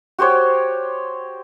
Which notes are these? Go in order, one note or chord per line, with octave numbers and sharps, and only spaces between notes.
F#4 G4 C5 C#5